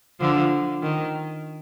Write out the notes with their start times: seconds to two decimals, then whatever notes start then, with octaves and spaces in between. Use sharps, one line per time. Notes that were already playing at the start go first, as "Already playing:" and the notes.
0.20 D3 F3
0.82 D#3